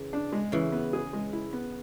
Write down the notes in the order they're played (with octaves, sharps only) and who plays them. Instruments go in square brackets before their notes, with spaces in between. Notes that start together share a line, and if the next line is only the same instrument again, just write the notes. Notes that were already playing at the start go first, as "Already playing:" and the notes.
Already playing: [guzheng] C#3 E3
[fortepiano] D4
G#3
[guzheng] C#3 E3 [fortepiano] E4
[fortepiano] B3
G#4
G#3
E4
B3